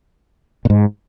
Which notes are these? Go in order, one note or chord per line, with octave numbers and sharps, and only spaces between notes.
A#2
G#2